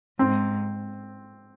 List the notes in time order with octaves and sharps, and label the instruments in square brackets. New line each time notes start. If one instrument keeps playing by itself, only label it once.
[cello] G#2 [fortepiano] C4